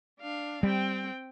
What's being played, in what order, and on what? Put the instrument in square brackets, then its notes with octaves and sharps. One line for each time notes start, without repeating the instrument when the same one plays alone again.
[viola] D4 F5
[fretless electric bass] G3 [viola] C4 G5